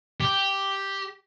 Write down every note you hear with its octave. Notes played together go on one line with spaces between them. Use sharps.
G4